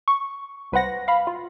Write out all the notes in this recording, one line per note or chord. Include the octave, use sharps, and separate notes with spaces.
C#6
C2 B4 C5 F#5 A#6
F5 B5
F4